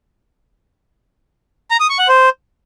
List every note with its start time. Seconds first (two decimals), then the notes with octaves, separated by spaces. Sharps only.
1.71 A#5
1.80 D#6
1.90 C#6
1.99 F#5
2.08 C5